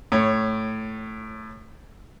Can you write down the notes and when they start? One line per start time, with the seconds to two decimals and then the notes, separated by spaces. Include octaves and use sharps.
0.12 A2 C#5